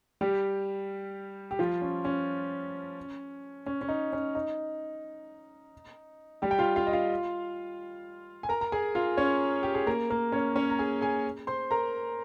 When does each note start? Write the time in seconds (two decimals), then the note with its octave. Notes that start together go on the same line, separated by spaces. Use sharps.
0.21 G3 G4
1.51 G4
1.59 F3 F4
1.82 C#4
2.05 C#4
3.66 C#4
3.81 C#4
3.89 D#4
4.13 C#4
4.35 D#4
6.42 G3 G4
6.51 G5
6.59 F4 F5
6.76 F4 F5
6.87 D#5
6.93 F4 F5
8.43 G#5
8.49 A#4 A#5
8.61 A#5
8.72 G#4 G#5
8.95 F4 F5
9.17 C#4 C#5
9.63 G4
9.74 G#4
9.87 A#3 A#4
10.10 A#3 A#4
10.32 C#4 C#5
10.56 C#4 C#5
10.70 A#5
10.79 G#4 G#5
11.01 G#4 G#5
11.47 C5 C6
11.71 A#4 A#5